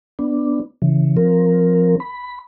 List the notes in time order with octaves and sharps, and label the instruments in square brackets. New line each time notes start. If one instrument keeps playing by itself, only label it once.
[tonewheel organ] B3 D4
C#3 E3
F3 C4 A#4
B5